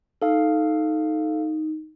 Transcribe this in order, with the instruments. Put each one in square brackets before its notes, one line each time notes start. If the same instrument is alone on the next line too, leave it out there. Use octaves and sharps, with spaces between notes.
[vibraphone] D#4 [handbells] A4 F5